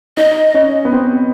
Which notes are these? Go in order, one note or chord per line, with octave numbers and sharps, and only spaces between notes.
D#4 D#5
C#4
B3
C4